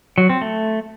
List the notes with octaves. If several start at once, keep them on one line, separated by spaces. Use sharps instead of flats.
F#3
C4
A3